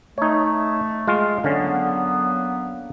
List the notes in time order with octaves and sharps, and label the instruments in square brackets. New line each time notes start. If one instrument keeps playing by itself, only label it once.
[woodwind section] A3 [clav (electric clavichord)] D#4 C#5
[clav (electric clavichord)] G#3 F4
[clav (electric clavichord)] D3 C#4 [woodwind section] F#3 A#3 B3